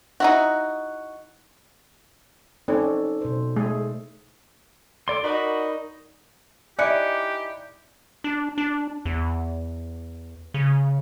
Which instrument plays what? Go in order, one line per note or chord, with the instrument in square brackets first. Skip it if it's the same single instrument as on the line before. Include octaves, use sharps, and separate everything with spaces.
[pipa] D#4 E4 F#4
[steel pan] C4 C#4 [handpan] D#4 A4 D5
[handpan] B2 C5
[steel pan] G#3 A3 G#4
[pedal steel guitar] A4 D5 C6
[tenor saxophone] D#4 [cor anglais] F#4 [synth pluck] A#4 D5 [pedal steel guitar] B5
[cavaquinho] D#4 E4 [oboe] G4 [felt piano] D5 [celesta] G#5 F#6 C#7
[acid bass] D4
D4
E2
C#3